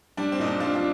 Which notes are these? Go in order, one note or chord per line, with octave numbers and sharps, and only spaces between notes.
G3 D4
C4
A#2 D#4
D4
G3 D4 F4
D4 F4